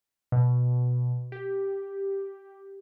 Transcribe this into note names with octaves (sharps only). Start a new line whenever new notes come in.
B2
G4